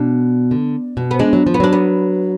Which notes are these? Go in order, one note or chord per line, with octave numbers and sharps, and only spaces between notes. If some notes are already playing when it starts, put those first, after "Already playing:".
Already playing: B2 D4
D3
B2
B3
G#3 D4
F#3
F3
B3
F#3 D4
B3